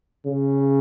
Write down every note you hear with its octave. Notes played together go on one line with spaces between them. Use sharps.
C#3